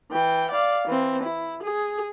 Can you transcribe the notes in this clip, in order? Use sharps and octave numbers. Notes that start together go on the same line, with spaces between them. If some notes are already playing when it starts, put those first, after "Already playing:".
E3 G5
D5 F5
E3 C4
E4
G#4